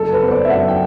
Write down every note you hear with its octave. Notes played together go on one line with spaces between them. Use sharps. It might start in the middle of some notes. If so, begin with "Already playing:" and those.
Already playing: F#1 A4
B4
B3 C5
D5
E5
F#2 F#5
G5